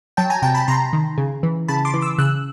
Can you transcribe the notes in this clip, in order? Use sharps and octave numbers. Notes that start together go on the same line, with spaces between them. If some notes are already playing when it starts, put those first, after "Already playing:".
F#3 G5 A5
G#5 A#5
C3 G5 A5
A5 B5
C3 A#5 C6
D#3
C#3
E3
C#3 A5 B5
C6 D6
E3
D6 E6
C#3 E6 F#6